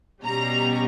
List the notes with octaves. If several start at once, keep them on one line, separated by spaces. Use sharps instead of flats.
B2 G3 C#4 A#5